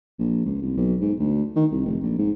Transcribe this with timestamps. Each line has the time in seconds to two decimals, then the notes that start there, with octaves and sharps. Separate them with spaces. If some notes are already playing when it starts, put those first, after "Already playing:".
0.19 A#1
0.45 C#2
0.62 C2
0.77 B1
1.01 G#2
1.19 D2
1.56 D#3
1.71 C2
1.85 F1
2.03 A#1
2.18 G#2